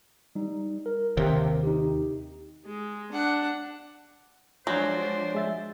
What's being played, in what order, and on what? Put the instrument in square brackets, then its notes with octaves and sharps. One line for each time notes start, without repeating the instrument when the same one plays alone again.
[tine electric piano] G3 D#4
A#4
[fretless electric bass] D#2 C3
[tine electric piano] D#4 G4
[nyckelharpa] G#3
D4 F#5
[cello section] F3 G#3 D4 [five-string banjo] F#3 [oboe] C5 [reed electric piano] G#5
[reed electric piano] G#3 E5 A6